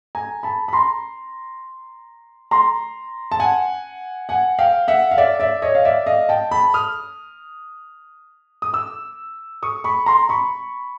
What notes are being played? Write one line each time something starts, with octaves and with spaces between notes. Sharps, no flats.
G#5 A#5
A5 B5
B5
A#5 C6
A#5 C6
A5
F#5 G#5
F#5 G#5
F5 G5
E5 F#5
F5
D5 E5
D5 E5
C#5 D#5
F5
D5 E5
D#5 F5
G5 A5
A5 B5
D#6 F6
D#6
D6 E6
C#6 D#6
B5 C#6
A#5 C6
B5 C#6